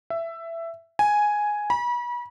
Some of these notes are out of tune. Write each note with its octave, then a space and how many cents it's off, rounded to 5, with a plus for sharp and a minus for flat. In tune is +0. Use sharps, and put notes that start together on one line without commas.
E5 +15
G#5 +5
B5 -35